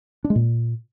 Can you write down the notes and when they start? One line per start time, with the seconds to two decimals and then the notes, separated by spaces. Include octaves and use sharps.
0.24 D4
0.30 G#3
0.35 A#2